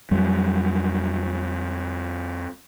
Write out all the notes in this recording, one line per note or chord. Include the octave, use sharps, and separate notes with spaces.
F2 F#3 G3